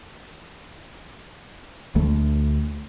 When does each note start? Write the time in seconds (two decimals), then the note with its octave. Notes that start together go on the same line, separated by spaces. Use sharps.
1.95 D2 A3